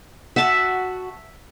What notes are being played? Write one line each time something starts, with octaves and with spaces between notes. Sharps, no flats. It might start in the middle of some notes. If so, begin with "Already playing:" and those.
F#4 E5 A5